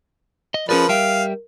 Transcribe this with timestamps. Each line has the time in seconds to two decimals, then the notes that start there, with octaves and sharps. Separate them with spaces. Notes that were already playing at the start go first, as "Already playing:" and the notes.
0.54 D#5
0.69 F3 C#4 G#4 A#4 B4 D5
0.89 G3 E5 F5 G5